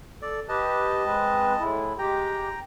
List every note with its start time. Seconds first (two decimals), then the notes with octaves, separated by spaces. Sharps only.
0.22 A4 D5
0.49 G4 B4 D#5 A5
1.05 G#3 C4 B4
1.59 A2 G#3 E4
1.99 G#3 G4 G5 A#5